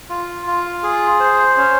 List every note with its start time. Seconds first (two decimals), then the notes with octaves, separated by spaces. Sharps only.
0.10 F4
0.47 F4
0.83 G#4
1.20 C5
1.57 C#4